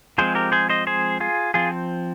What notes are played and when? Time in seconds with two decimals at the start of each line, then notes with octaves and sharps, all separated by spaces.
0.18 F3 G#3 C4 G#4 C5
0.35 G4 A#4
0.52 G#4 C5
0.69 C5 D#5
0.87 G#4 C5
1.20 F4 G#4
1.54 F3 C4 F4 G#4